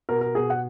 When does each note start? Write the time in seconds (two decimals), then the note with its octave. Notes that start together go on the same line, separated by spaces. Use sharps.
0.09 B2 A#4
0.21 A#4
0.35 B2 G#4
0.50 F#5